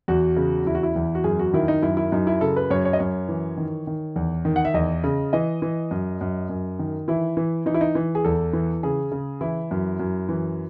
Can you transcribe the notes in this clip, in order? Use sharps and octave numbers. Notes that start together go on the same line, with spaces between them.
E2 F#4
C#3
E2 E4
F#4
E4
E2
F#4
F#2 G#4
F#4
D#3 E4
D#4
F#2 E4
E4
F#2 D#4
E4
C#3 A4
B4
F#2 C#5
C#5
D#5
F#2 C#5
E3
D#3
D#3
E2
D#3
F#5
E5
E2 D#5
C#3
E3 D#5
E3
F#2
F#2
F#2
D#3
E3 E4
E3
E3 D#4
E4
D#4
E3
G#4
E2 A4
E3
C#3 G#4
C#3
E3 E4
F#2
F#2
E3